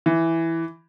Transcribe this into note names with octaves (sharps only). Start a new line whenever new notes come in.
E3